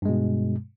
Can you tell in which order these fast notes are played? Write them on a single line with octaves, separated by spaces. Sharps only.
G2 G#3 B2